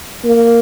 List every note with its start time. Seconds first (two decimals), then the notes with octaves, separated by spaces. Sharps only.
0.24 A#3